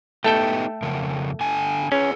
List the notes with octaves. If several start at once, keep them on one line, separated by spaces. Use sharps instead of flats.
A3 B3 D#4 G4 A4 G5
F2 C#3 A#4
D3 G#5 A5
C#4 G#4 B4